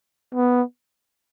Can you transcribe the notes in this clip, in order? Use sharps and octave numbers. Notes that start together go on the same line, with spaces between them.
B3